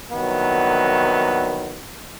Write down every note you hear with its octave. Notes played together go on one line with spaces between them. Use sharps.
C2 D#3 F#3 B3